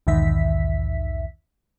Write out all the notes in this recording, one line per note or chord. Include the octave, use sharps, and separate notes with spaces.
B1 E2 G#2 D#3 E5 B6